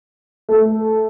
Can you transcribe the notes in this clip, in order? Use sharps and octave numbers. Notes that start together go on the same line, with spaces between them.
A3